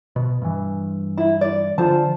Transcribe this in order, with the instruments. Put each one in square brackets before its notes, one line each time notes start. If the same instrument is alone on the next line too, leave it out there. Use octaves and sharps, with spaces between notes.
[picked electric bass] B2
G2 E3
[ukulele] E4 E5
D5
[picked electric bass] D3 E3 F3 [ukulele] F4 C5 A5